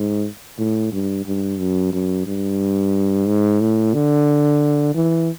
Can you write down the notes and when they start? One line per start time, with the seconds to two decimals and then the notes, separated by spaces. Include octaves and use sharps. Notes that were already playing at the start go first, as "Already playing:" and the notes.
Already playing: G#2
0.58 A2
0.93 G2
1.26 G2
1.59 F#2
1.93 F#2
2.27 G2
3.27 G#2
3.61 A2
3.94 D3
4.95 E3